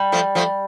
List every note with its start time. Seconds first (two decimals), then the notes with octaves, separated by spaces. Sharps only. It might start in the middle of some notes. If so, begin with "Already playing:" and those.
Already playing: G3
0.12 F3 A3
0.35 F3 A3